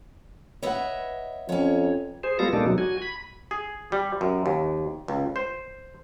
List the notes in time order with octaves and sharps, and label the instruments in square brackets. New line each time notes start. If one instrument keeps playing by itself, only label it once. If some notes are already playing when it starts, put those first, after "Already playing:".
[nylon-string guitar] B4 F#5 [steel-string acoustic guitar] C#5 D#5 E5
[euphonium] F2 [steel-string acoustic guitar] C#4 C#5
[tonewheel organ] G#4 C5
G3 G#3 B3 F4 A4 A#6
B2 G#3 A#3 D4 D#4 A4
F#3
F#4 G#5
B5
[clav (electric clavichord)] G#4
G3
F#2
D#2
C#2
C5